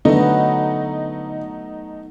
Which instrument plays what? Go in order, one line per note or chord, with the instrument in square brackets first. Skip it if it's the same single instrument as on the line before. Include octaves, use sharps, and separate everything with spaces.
[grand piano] D3 D4 [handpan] F#3 B3 [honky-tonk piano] A3 D#4